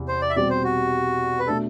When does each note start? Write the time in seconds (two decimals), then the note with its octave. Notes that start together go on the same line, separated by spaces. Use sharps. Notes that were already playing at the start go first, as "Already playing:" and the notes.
Already playing: E2 C3 E3
0.08 C5
0.22 D5
0.30 E5
0.36 B2 G3 C4 G4 D5
0.50 C5
0.64 F#4
1.40 B4
1.47 B2 A3 D4 A4